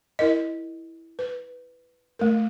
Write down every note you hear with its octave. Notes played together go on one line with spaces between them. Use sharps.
E4 A#4 D#5
B4
A3 A#4